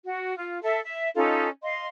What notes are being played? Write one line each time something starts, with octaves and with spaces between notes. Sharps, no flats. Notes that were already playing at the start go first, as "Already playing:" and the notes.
F#4
F4
A4 E5
E5
C#4 D#4 F4 A4
D#5 F5 C6